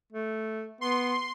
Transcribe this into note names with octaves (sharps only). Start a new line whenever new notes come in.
A3
B3 C6